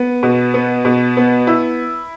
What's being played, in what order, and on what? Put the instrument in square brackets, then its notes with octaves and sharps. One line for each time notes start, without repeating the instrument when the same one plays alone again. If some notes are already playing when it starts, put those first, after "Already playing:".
Already playing: [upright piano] B3
B2
B3
B2
B3
E4